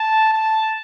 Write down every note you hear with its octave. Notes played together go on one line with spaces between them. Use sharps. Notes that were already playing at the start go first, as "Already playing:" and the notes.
Already playing: A5
A5